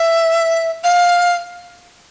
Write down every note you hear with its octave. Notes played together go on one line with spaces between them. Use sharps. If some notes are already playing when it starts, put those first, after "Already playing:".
Already playing: E5
F5